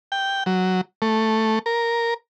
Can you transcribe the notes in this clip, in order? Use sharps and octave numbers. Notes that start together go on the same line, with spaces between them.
G5
F#3
A3
A#4